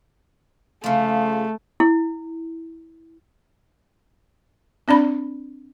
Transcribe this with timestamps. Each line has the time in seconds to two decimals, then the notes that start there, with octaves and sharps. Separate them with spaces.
0.84 C#3 F3 A3
1.80 E4
4.88 C4 D4 D5 B5